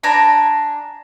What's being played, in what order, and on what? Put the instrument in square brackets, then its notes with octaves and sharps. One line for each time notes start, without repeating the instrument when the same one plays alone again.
[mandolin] D4 G#5 A#5 B5